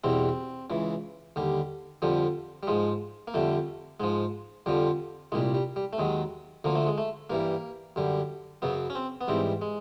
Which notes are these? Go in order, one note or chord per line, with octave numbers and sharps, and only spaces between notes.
E2 B2 G3 C4
C#2 C#3 E3
D#2 D3 G3
F2 D3 F3 G3
G3
G#2 F3 G#3
A#3
F2 D3 G3 A3
G#2 F3 G#3
F2 D3 F3 G3
C2 A#2 G3 G#3
G3
G3
A3
D#2 D#3 F#3 G#3
D2 D3 F3 A#3
A3
G#3
A3
G2 E3 G3 A#3
F#2 D3 G3
F#2 C#3 F#3 B3
C#4
C4
B3
G#2 E3 G3 C4
G#3